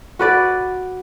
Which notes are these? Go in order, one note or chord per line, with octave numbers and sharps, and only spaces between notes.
F#4 B4 D5